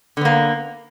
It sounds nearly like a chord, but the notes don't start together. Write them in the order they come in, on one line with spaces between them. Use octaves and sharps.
D3 B3 A#3